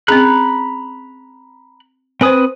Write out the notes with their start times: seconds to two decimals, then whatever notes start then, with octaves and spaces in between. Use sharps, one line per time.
0.08 C4 C#4 G#4 A#5 B5 F#6
2.21 C4 B4 C5 G#5 D#6